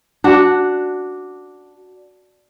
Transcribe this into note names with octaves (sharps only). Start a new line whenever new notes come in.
D4 F#4